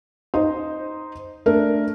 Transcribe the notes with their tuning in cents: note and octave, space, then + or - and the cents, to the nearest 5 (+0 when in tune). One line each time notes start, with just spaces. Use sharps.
D#4 +0 C5 +0 D#5 +0
A3 +0 D4 +0 A#4 +0